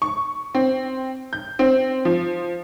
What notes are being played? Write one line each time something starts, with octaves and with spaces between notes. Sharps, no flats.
C#6
C4
G6
C4
F3